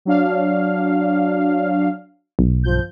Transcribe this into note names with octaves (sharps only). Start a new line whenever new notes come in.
F#3 D4 F5
B1
G1 F3 G6